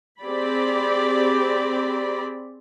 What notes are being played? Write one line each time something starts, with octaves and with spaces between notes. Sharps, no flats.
C4 G4 G#4 D5 B5